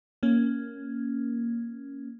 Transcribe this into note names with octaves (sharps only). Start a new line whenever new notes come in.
A#3 C#4